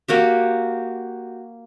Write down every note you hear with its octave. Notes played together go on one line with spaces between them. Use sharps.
A#3 F#4 G4